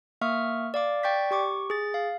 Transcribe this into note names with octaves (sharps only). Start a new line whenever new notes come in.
A#3 E5 C#6 D#6 F6
D5 F5 D6
D5 G5 C#6 G6 A6 B6
G4 C#6 D6
G#4 A6
F5